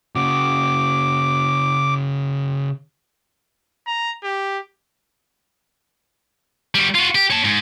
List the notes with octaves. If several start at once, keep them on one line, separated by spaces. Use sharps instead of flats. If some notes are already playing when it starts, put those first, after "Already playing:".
C#3 F#4 D6
A#5
G4
G3 F#4
F4 F#4
G4
C#5 A5
G#2